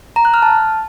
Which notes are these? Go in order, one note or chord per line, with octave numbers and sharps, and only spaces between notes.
A#5
F#6
F6
A5